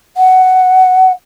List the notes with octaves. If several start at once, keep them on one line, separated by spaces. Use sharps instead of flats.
F#5